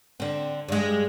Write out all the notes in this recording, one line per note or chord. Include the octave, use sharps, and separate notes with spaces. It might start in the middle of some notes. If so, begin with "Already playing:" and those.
D3 C4
G2 G#3